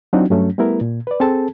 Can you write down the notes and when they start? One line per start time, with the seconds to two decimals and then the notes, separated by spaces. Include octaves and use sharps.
0.13 F#3 C4 D4 D#4 F4 F#4
0.30 G2 F#3 A3 C#4
0.58 G3 A3 B3 E4 A#4
0.81 A#2
1.07 B4 D5
1.20 C4 G#4 A4 A5